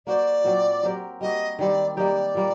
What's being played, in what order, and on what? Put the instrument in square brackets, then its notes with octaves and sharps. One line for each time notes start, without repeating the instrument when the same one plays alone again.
[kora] A#3 F#4 C5 [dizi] D5
[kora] A#2 F#3 C4 F#4
F#3 C4 G4 A#4
[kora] G3 A#3 F#4 [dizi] D#5
[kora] D#3 G3 C4 [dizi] D5
[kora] G3 A#3 D#4 G4 [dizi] D5
[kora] A#2 G3 A#3